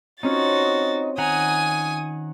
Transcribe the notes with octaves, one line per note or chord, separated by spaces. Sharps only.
C4 C#4 D#4 F4 F#4 A6
D#3 F#5 G#5 A#5 D#6